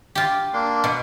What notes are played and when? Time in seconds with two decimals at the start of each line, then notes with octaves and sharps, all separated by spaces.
0.15 F4 G4
0.54 A#3 D4 C6
0.84 B2